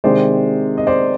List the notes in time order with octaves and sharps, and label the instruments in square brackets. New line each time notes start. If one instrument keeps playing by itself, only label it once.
[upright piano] C3 D#3 G#3 C5 D5
D#5
C5 D5